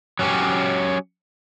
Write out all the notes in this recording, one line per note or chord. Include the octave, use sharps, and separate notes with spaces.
F#3 C#4 G4